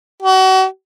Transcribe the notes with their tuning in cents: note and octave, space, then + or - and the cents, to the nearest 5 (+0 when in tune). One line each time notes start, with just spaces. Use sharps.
F#4 +35